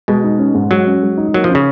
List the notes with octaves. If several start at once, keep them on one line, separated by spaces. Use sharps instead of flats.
B2 G#3
D#4
C#4
G#2
F#3 G#3
C#4
G#3
D#4
F#3 A#3
F3
C#4
C#3